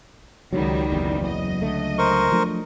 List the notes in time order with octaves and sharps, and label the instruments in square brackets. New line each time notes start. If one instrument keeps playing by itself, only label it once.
[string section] C#2 D#3 G3 [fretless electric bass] F#3
[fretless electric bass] F#1 E2
[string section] F#3 D#5
[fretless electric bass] C#2 D3 A3
[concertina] A#4 C5 C#6
[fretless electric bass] F3 A3 D4